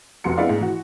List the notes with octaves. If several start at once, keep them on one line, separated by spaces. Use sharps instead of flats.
F1 C3 F3 F#4 C6 C#7
G#3 B3 D4 E4 D5 F5
G#2
E3 F#4